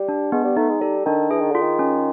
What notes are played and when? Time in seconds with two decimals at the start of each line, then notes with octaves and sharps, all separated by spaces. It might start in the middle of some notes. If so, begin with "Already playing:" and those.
Already playing: G3
0.08 D4
0.32 G#3 B3
0.44 G3
0.57 A3 D#4
0.69 G#3
0.81 G3 A4
1.05 D#3 D4
1.31 E3 G#4
1.41 D#3
1.51 D3 F4
1.62 D#3
1.79 C#4